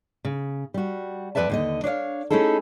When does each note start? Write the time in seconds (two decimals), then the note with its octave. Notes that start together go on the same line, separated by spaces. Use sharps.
0.25 C#3
0.74 G3 F#4
1.35 F2 F3 B4 D5 E5 A5
1.50 D#2 D3 D#5
1.84 D4 C#5 D5 F5
2.30 A3 C#4 D#4 E4 G#4 A4